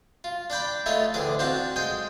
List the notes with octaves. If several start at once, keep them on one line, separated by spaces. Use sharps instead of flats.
F4
D4 D5 G5 B5
A3 E4 F4 G#4 C#5 D#5
A1 D2 D4 G#4 D5
C4 D4 F4 F#4 C5 A5
G#3 C5 D#5 G5